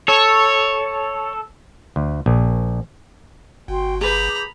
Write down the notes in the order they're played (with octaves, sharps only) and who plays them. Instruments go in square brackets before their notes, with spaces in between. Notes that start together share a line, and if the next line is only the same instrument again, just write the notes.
[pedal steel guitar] A4 [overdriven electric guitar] C#5
[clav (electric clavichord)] D2
A#1
[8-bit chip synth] G1 [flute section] F#4 G5 C6
[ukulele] G#4 B4 [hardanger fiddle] A#5 B5 [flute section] D6 G6